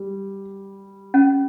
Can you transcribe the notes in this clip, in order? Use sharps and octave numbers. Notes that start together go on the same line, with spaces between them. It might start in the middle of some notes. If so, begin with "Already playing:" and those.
Already playing: G3
C#4